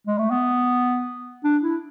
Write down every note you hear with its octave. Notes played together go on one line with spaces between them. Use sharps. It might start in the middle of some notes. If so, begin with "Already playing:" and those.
G#3
A3
B3
D4
E4